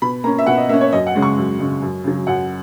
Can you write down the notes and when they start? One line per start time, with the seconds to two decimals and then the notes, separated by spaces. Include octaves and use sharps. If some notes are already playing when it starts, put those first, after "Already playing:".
0.02 B2 B5
0.24 A#3 C#4 A#5
0.39 E5
0.46 B2 F#5
0.57 D#5
0.69 A#3 C#4 E5
0.81 C#5
0.92 F#2 D#5
1.07 F#5
1.15 C#3 G#3 C#4
1.22 C#6
1.37 F#2
1.59 C#3 G#3 C#4
1.82 F#2
2.04 C#3 F#3
2.27 F#2 F#5